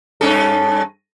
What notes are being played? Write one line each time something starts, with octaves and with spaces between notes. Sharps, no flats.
G2 C#4 A4